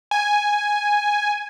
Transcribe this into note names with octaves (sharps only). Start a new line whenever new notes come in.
G#5